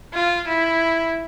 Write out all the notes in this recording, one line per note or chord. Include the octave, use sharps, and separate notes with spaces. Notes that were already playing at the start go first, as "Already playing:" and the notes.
F4
E4